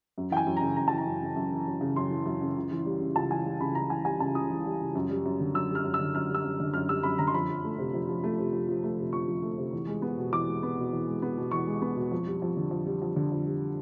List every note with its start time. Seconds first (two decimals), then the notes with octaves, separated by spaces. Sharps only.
0.18 F#2
0.31 E3 G5
0.37 G#5
0.47 F#2
0.57 C#3 A#5
0.76 F#2 A#5
0.88 E3 A5
0.98 A#5
1.06 F#2
1.22 C#3
1.36 F#2
1.52 E3
1.67 F#2
1.81 C#3
1.96 F#2 C6
2.11 E3
2.26 F#2
2.42 C#3
2.56 C#2
2.71 E3
2.86 G3
3.01 C#3
3.16 C#2 A5
3.30 E3 G#5
3.46 G3
3.60 C#3 B5
3.75 C#2 A#5
3.90 E3 G#5
4.05 G3 G#5
4.20 C#3 A5
4.35 C#2 D#6
4.50 E3
4.65 G3
4.81 C#3
4.95 F#2
5.10 G3
5.25 F#2
5.40 D3
5.54 F#2 E6
5.70 G3
5.75 F6
5.84 F#2
5.94 E6
6.00 D3
6.14 F#2 F6
6.30 G3 E6
6.44 F#2
6.60 D3
6.74 F#2 F6
6.89 G3 E6
7.03 F#2 B5
7.18 D3 A#5
7.27 C6
7.34 F2 B5
7.49 F3
7.64 A3
7.78 C3
7.94 F2
8.09 F3
8.24 A3
8.38 C3
8.53 F2
8.68 F3
8.84 A3
8.99 C3
9.13 F2 C#6
9.28 F3
9.43 A3
9.58 C3
9.73 E2
9.87 G#3
10.02 B3
10.18 B2
10.32 E2 D6
10.48 G#3
10.63 B3
10.78 B2
10.93 E2
11.07 G#3
11.22 B3
11.37 B2
11.51 E2 C#6
11.67 G#3
11.82 B3
11.96 B2
12.12 F2
12.27 G3
12.42 F2
12.57 D3
12.71 F2
12.86 G3
13.02 F2
13.16 D3
13.32 F2
13.46 G3